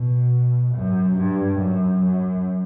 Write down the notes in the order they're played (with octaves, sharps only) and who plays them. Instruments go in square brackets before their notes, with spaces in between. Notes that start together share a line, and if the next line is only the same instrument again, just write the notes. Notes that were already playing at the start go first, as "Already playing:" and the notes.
Already playing: [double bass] B2
F#2
G2
F#2
F#2